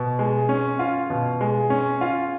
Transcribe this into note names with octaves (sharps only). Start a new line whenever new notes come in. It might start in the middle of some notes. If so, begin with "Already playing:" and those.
Already playing: B2
G#3
C#4
F4
B2
G#3
C#4
F4